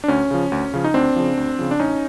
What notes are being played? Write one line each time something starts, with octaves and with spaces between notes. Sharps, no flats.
D4
D2 C#4
C#3 F3
D2
C#3 F3
D#4
D2 C4 D4
C#3 F3
D2
C#3 F3
D4
A1 C#4 D#4